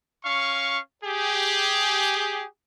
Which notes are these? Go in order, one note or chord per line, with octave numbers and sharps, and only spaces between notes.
C#4 F5 C#6
G4 G#4